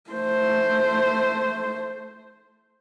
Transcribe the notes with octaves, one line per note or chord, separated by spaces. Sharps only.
A3 C5